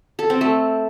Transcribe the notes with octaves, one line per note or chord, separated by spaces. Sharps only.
A4
C4
A3